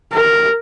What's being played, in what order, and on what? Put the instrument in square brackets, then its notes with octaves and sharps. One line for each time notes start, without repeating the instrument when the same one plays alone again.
[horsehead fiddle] A#4